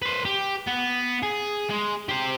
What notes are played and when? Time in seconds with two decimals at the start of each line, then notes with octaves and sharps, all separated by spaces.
0.02 B4 C5
0.25 G4
0.67 B3
1.23 G#4
1.70 G#3
2.09 G4 C5